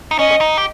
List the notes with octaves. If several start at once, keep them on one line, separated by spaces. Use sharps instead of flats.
D#4
C#4 D#5
D#4
G4